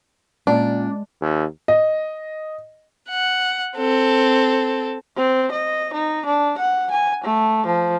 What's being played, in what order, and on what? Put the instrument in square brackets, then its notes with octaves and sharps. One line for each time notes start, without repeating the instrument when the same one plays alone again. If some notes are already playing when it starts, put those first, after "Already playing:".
[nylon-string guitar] A#2 [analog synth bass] G#3 [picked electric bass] C#4 [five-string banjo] D4
[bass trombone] D#2
[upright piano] D#5
[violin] F#5
C4 A4
[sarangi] C4
D#5
D#4
D4
F#5
G#5
A3
F3